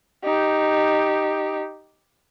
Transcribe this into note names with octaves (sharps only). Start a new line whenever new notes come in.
D#4 G4